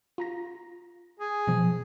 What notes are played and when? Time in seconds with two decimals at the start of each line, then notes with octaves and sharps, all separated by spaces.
0.18 F4 A#5 A#6
1.20 G#4
1.47 B2 F3